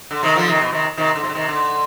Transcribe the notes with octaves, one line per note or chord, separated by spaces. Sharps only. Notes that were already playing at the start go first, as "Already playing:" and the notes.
D3
C3 D#3
D3 F3
C3 D#3
B2
C3 D#3
C3 D#3
D3
C3
D3
C3 D#3
D3